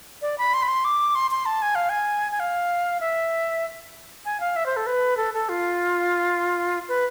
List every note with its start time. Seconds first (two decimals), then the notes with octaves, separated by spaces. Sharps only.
0.22 D5
0.38 B5
0.54 C6
0.63 B5
0.68 C6
0.85 D6
1.15 C6
1.31 C6
1.46 A5
1.62 G#5
1.75 F5
1.89 G#5
2.32 G#5
2.40 F5
3.01 E5
4.25 G#5
4.40 F5
4.56 E5
4.66 C5
4.77 A4
4.87 B4
5.17 A4
5.34 A4
5.49 F4
6.89 B4